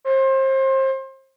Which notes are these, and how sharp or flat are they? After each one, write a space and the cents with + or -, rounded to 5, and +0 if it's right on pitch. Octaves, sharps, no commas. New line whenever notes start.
C5 +30